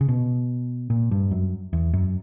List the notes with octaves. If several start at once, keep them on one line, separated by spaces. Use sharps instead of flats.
C#3
B2
A#2
G2
F#2
E2
F#2